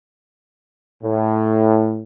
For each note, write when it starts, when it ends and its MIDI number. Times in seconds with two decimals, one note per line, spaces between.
1.03 2.02 45